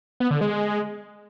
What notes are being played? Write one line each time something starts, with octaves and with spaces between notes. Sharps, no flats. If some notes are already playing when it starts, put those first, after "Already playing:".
B3
D3
G#3